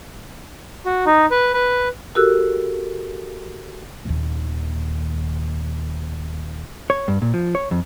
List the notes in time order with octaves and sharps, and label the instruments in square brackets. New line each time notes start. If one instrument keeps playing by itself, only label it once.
[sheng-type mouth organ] F#4
D#4
B4
B4
[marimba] F#4 G4 A4 A#4 E6 F#6
[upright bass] D#1 D#2
[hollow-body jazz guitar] C#5
G2
A#2
F3
C#5
F2